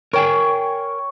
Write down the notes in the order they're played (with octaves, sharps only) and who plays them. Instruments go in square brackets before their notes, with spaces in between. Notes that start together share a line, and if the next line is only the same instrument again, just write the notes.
[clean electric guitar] A#4 G5 G#5 [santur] C#5